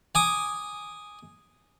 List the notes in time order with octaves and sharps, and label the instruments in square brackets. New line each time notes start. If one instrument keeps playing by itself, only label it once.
[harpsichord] G#5 D6 D#6